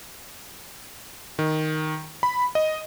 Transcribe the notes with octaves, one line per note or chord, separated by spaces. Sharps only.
D#3
B5
D#5